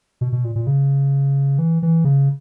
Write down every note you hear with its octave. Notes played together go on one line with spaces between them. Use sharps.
B2
B2
A#2
A#2
C#3
E3
E3
C#3